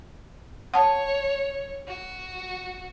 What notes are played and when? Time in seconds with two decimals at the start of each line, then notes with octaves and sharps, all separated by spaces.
0.74 C#5 F#5 A5
1.88 F#4